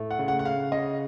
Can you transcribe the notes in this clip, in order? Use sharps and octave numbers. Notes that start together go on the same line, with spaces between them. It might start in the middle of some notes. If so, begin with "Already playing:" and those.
Already playing: A2 A3
F#5
C#3
F#5
F#5
C#3 F5
C#3 D#5